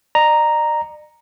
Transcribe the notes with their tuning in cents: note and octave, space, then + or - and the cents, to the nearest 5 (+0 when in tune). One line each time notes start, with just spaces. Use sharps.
D5 +45 A#5 +0